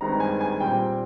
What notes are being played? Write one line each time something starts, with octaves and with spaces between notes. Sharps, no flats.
G2 D#3 G#3 C4 A#5
G#5
G#5
A#2 G3 C4 G5